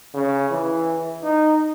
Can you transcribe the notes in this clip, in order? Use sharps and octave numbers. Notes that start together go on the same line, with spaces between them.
C#3
E3
D#4